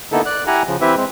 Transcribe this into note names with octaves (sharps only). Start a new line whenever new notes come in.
D3 A#3 B3 D#4 E4 A4
D5 F#6
E4 G4 F#5 G#5 A#5
C#3 F3
E3 C4 E4 G4 B4 E5
G#3 C4